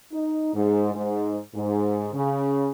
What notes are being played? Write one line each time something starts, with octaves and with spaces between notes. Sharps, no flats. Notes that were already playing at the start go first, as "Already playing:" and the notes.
D#4
G#2
G#2
G#2
C#3